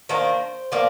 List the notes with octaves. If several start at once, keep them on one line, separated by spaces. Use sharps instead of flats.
D#3 A#3 D4 C5
F3 A#3 D5